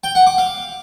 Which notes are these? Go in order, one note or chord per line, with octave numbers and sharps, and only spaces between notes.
G5
F#5
D6
F5